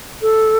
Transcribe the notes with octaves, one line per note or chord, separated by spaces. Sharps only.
A4